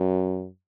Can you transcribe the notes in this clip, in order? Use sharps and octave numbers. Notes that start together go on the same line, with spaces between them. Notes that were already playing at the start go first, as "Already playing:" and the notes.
Already playing: F#2